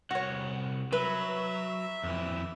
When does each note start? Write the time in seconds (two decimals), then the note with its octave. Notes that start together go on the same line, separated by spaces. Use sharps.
0.11 C2 F#4 C#5 F#5
0.92 F#3 B4 E5
2.03 F2 E3